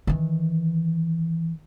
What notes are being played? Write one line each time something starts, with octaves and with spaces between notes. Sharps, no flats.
D#3 E3